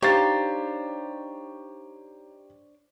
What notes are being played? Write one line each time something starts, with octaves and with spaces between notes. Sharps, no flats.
D4 D#4 F4 G4 C5 C#5 A6